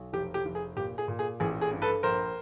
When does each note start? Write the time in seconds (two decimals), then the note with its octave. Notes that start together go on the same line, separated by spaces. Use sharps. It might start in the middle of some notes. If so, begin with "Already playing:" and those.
Already playing: B1
0.13 F1 G4
0.34 G4
0.45 F1
0.55 G#4
0.76 A#2 G4
0.98 G#4
1.08 A#2
1.19 G#4
1.40 A1 G#4
1.61 G#4
1.71 G2
1.82 A4 B4
2.03 A#1 A#4 C5